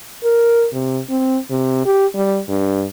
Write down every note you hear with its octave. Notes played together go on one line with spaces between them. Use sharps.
A#4
C3
C4
C3
G4
G3
G2